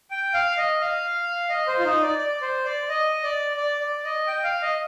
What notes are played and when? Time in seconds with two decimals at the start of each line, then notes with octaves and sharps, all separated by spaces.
0.11 G5
0.34 F5
0.58 D#5
0.81 F5
1.49 D#5
1.67 C5
1.79 F4
1.84 D#4
2.02 D5
2.18 D5
2.42 C5
2.65 D5
2.89 D#5
3.24 D5
3.57 D5
3.80 D5
4.04 D#5
4.27 G5
4.44 F5
4.62 D#5